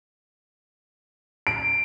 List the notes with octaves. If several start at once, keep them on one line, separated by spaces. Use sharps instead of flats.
D7